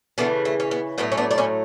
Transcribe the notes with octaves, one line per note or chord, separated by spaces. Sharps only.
C#3 E3 A3 B3 D4
A3
C#4
B3
A2 F#3 A3 B3
C#4
B3 D4
D4
C#4 E4